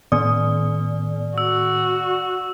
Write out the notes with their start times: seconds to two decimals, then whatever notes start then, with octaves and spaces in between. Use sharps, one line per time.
0.12 A2 D#3 B3 D5 D#6
1.38 F#4 E6